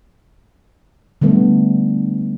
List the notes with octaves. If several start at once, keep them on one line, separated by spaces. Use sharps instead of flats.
D3 G3 A3 B3